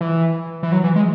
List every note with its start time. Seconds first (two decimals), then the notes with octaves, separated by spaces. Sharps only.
0.01 E3
0.63 E3
0.72 F#3
0.84 E3
0.96 G#3